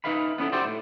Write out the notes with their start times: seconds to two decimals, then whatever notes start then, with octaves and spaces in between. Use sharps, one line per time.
0.04 D#4 E4 B4 E5 F5 B5
0.38 B3 C#4 E4 A4
0.52 F#4 G4 C5 D5 E5 G5
0.65 A2